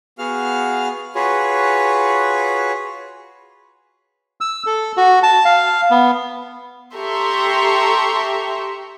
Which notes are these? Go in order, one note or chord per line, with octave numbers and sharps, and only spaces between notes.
B3 F#4 G#4 F5 F6
F4 F#4 G#4 B4 C#5
E6
A4
F#4
A5
F5
B3
G4 A4 E5 A#5 C6 C#6